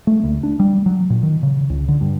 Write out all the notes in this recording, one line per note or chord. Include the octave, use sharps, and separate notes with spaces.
A3
D2
D4
G3
F#3
A#2
D#3
C#3
C#2
D3
G2